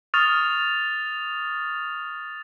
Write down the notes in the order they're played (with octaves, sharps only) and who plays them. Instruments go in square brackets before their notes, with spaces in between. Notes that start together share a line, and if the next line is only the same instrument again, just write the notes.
[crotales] C#6 D#6 F6 A6 F7